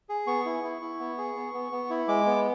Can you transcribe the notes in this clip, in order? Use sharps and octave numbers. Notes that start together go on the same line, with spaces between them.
G#4
B3 C#6
E4
E4
E4
B3
G#4
B3
B3
B3
E4
G#3 D6
B3